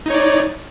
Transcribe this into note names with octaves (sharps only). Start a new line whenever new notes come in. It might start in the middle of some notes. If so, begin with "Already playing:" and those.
D#4 C#5 D5